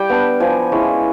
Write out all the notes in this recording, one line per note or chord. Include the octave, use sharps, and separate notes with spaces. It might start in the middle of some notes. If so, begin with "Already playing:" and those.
Already playing: G3 G5
B3 D4
F3 G#5
G#3 C#4 E4